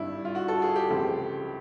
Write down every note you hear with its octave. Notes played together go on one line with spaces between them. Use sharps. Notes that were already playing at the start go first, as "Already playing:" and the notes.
Already playing: G#1 G2 D3 G3 E4
F4
F#4
A4
G#4
G4
C#2 C#3 F3 A3 C4